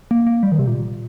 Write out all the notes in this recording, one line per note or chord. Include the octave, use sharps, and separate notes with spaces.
A#3
A#3
G3
D#3
C3
A#2